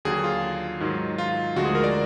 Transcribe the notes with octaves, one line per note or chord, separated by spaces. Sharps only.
D#2 D3 F#3 G#4
F4
G#2 D#3 F#3
F4
D2 D3 F3 G#3 F#4
G#4
A#4
D5